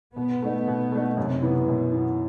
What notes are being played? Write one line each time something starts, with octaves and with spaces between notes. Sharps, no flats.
B2 B3
A3 D#4
B2
A3 D#4
F#2 C3
E3 B3
F#2 B2
E3 B3